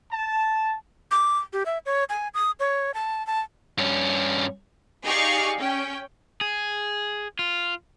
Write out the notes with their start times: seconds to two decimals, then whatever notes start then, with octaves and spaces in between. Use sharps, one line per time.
0.12 A5
1.11 D6
1.53 G4
1.66 E5
1.86 C#5
2.09 G#5
2.34 D#6
2.60 C#5
2.94 A5
3.27 A5
3.78 G2 C#4
5.04 D#4 G4 G#4 D5 F5 C#6
5.58 C#4 G5
6.41 G#4
7.39 F4